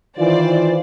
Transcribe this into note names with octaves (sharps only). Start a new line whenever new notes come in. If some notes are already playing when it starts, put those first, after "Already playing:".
D#3 E3 F4 C5 D5